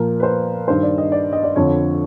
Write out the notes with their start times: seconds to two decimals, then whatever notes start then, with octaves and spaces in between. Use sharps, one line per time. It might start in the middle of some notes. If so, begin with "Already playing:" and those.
Already playing: A#2 F3 A#4
0.20 B4
0.23 C5
0.68 G2 D#3 C5
0.83 D5
0.98 D#5
1.12 D5
1.33 D#5
1.44 D5
1.56 F2 D3 F3 C#5